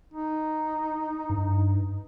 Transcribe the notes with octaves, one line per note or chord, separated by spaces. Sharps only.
D#4
G2